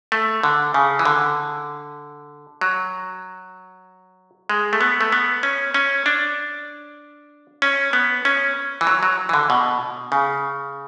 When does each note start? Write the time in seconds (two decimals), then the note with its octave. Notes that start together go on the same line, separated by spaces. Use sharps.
0.12 A3
0.43 D3
0.74 C#3
0.99 E3
1.05 D3
2.61 F#3
4.50 G#3
4.73 A3
4.81 B3
5.01 A3
5.12 B3
5.43 C#4
5.74 C#4
6.06 D4
7.62 C#4
7.93 B3
8.25 C#4
8.81 E3
8.87 F#3
9.03 F#3
9.29 E3
9.34 D3
9.50 B2
10.12 C#3